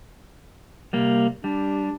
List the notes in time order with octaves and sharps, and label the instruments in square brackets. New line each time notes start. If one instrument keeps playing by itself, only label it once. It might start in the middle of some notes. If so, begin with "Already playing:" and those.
[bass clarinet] C3 [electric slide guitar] G3 A#3
[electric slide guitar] G3 [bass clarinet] D4